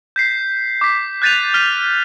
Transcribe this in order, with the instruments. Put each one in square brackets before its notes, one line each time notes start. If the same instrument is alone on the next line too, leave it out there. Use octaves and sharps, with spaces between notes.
[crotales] G6 B6 C7
D6 B6
F#6 G6 A6 B6 D#7 F7
F6 B6 D#7